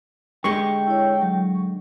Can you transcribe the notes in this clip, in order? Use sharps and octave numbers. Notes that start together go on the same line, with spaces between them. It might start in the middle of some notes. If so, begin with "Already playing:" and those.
D3 G#3 G4 G5 C#6
E4 C#5
F#3